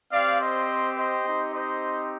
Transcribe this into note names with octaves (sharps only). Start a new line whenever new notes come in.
C4 G4 D5 F5
C5 D#5
C5 D#5
C4 D#4 G4
C5 D#5